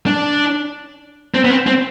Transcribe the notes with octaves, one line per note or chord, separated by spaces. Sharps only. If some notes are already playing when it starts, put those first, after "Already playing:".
D4
C4
B3
C4
C4